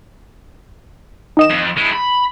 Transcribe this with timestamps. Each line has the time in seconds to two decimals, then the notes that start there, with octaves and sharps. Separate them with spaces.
1.37 D#3 D#5 E7
1.51 F2
1.77 G#3 E4
1.93 B5